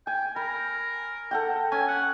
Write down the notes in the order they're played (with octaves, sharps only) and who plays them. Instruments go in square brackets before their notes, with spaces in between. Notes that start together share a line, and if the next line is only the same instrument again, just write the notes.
[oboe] G5 [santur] G#5
[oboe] A#4 [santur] B5
[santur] A4 F#5 G5
[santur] C#4 [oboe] G#5
[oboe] F#5